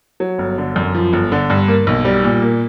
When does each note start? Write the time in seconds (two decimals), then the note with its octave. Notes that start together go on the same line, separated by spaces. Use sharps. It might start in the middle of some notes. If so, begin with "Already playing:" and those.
0.20 F#3
0.38 G1
0.58 D3
0.76 F#2
0.94 F3
1.13 G1
1.32 D3
1.50 G2
1.68 A#3
1.87 B1
2.05 G3
2.24 A#2
2.42 A#3